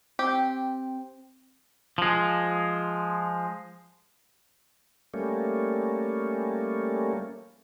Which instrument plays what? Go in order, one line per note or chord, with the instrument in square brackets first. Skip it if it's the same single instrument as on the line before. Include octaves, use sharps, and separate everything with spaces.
[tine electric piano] C4 [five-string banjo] G4
[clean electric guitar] F3 G#3
[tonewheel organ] G3 A3 A#3 C#4